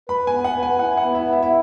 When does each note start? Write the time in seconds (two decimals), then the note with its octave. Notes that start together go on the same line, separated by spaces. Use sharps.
0.09 B4 B5
0.27 G#5
0.33 B3
0.44 F#5
0.56 B4
0.63 G#5
0.79 E4 F#5
0.97 F#5
1.03 B3
1.15 E5
1.26 E4
1.32 E5
1.43 E5